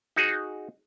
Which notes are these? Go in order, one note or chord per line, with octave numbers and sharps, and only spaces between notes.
D#4 F#4 G#4